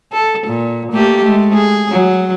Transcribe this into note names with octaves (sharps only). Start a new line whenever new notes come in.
A4
A#2
A3 A#3 G4
G#3 A3
G#4
F#3